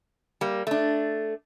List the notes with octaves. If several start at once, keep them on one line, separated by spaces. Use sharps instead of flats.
G3 A#3
A3 D4